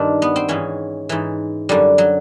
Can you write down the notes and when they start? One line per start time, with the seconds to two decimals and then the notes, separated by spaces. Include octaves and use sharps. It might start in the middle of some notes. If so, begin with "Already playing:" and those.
Already playing: G2 D#3 D4
0.22 B3
0.36 C4
0.48 G#2 E3 C#4
1.09 G#2 E3
1.69 F#2 D3 G3
1.98 F#3